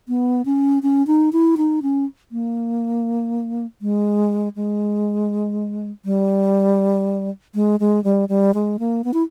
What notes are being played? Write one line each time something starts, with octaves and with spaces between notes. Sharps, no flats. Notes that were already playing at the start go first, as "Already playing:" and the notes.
B3
C#4
C#4
D#4
E4
D#4
C#4
A#3
G#3
G#3
G3
G#3
G#3
G3
G3
G#3
A#3
B3
E4